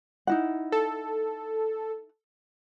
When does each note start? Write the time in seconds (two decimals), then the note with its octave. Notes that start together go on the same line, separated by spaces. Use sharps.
0.27 D#4 E4 F#5
0.72 A4